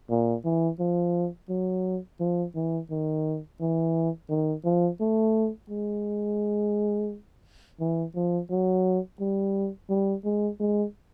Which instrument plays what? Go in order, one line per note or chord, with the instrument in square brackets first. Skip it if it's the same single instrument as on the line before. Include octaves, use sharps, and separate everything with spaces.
[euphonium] A#2
E3
F3
F#3
F3
E3
D#3
E3
D#3
F3
A3
G#3
E3
F3
F#3
G3
G3
G#3
G#3